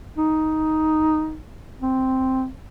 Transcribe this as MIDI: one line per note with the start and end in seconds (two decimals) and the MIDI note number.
0.17 1.37 63
1.81 2.47 60